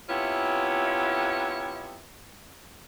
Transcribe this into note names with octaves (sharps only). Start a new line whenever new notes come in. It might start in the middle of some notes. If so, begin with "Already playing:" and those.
C3 B3 C#4 E4 F4